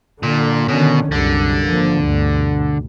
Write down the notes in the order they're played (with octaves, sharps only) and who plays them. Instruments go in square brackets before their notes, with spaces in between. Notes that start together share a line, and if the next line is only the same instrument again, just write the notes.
[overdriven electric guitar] A#2 [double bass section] D3
[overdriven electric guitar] B2 [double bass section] D3 D#3 C#4
[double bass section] C2 F#2 G3 [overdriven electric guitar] D3
[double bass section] G#1 F3 A#3
D2 G2 B2